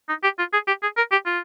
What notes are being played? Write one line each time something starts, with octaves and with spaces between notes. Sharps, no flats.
D#4
G4
F4
G#4
G4
G#4
A#4
G4
F4